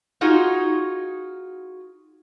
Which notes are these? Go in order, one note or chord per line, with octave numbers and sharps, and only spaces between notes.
D#4 F4 F#4 G#4